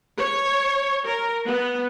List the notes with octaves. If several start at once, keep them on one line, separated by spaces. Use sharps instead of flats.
C#5
A#4
B3